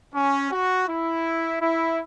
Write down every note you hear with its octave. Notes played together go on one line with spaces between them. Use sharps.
C#4
F#4
E4
E4